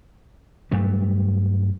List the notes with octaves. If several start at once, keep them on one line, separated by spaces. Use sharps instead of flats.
G2 F#3 G3 A3